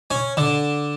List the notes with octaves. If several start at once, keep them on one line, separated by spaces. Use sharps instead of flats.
C#4
D3